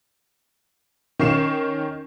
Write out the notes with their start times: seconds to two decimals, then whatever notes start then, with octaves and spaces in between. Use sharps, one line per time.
1.19 D#3 C#4 C#6 C7 E7